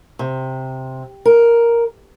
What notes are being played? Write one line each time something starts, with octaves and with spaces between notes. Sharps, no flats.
C3
A#4